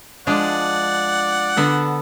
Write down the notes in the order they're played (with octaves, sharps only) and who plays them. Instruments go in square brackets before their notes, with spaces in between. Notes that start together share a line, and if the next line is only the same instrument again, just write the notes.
[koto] F3 G#3 D4 [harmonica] D5 F#5
[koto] D3 B3 A4